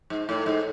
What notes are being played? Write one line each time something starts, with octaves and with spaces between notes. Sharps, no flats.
G#2
A2
G#2